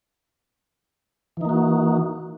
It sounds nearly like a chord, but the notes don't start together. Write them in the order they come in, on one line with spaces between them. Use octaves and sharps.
E3 D#4 A#3 F#4